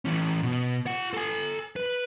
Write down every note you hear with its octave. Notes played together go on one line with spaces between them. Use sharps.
E3 C#4
B2
F4 F#5
A4 G#5
B4